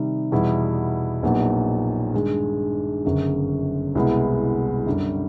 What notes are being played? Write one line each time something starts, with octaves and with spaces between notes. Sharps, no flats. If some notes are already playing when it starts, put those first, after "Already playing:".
Already playing: C3 D#3 G3
E2 B2 G3 B3 E4
A#1 A#2 F#3 B3 D#4
G2 D#3 G#3
G1 F#2 C#3
C2 B2 G#3 B3 E4
F#2 D3 G3